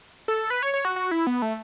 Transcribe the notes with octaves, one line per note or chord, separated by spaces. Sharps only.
A4
B4
C#5
C#5
F#4
F#4
E4
B3
A3